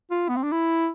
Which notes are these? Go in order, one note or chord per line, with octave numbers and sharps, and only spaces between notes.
F4
B3
C4
D4
E4